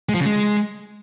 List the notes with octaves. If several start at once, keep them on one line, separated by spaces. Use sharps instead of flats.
G#3
F3
C#3
G#3